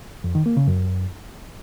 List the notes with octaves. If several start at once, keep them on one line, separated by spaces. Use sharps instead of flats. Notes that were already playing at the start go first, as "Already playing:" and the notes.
F2
D#3
A#3
C#3
F#2